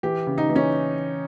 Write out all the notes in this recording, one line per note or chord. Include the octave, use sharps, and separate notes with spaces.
E3 G4
C#3
D#4
E3
C#4